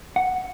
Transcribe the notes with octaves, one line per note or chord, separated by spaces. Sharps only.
F#5